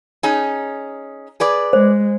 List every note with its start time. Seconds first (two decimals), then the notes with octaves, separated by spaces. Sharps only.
0.23 C#4 D#4 G#4
1.40 G#4 B4 D5
1.73 G#3 C5